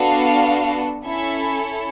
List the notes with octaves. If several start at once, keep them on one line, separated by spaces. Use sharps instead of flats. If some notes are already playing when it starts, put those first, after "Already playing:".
Already playing: B3 D4 F#4 A4 F5
C#4 E4 A4 E5